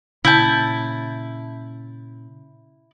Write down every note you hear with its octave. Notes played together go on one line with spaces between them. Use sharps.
A#2 C#3 E4 A5 E6 G6